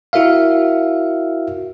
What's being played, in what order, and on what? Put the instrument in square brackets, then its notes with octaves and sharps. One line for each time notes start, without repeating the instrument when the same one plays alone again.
[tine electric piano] E4 F#4 A#4 E5 F5